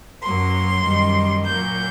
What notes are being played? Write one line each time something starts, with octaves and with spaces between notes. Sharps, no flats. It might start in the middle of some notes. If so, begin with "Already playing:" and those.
F#2 F#3 A#3 C6
F#2 D#3 G3
A#2 F#3 A#3 G6